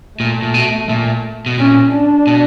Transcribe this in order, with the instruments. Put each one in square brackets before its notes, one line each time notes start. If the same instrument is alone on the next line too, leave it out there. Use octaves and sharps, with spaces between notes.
[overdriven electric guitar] A#2 [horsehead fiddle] A3
[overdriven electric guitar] A#2
B2
A#2
B2
[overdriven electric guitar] A#2 [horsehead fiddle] C#4
[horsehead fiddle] D4
[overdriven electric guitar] B2